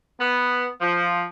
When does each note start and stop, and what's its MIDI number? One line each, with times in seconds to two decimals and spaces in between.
0.20 0.67 59
0.81 1.25 53